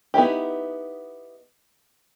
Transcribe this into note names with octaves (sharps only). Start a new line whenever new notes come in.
B3 D#4 E4 G4